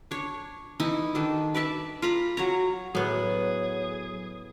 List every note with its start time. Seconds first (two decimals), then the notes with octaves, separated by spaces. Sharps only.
0.11 D4 C#5
0.80 E3 D#4 E4
1.15 D#3 D4 A4
1.55 B4 D5 E5 A5
2.02 F4 A#5 B5
2.37 F#3 C#5 A#5
2.95 A2 F#3 B3 G#4 C#5